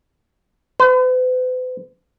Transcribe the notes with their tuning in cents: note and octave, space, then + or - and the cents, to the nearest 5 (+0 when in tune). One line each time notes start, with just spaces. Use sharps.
B4 +45